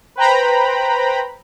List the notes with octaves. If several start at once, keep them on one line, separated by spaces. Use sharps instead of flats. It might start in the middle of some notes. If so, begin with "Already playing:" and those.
B4 C5 G5 A#5 B5